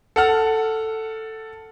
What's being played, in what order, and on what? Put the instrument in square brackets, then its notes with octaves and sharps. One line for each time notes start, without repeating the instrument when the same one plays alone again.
[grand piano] A4 F#5 F6